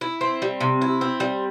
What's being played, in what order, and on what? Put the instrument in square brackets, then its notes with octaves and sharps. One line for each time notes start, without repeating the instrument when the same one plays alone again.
[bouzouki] E4
C4
G3
C3
E4
C4
G3